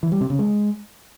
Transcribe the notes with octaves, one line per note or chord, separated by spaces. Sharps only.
E3
G3
C3
C#3
G#3